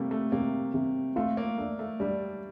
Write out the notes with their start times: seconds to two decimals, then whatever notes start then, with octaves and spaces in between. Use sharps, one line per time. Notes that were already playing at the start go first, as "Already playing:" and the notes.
Already playing: C3 G3 A3 A#3
0.11 A3
0.32 C3 A#3
0.74 C3
1.16 A3 F4
1.37 A#3
1.58 A3 D4
1.79 A3
1.99 G3 D4